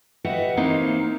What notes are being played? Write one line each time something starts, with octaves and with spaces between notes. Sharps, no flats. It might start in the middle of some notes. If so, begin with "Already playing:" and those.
F#4 G4 B4 D#5 E5 F#5
E3 A#3 C4 D#4 C#5 F5